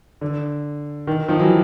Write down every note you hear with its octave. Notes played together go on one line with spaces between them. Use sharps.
D3
D#3
D#3 F3
E3 F#3